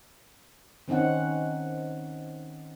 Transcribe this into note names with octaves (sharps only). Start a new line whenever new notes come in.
D#3 C4 C#4 D#4 F#5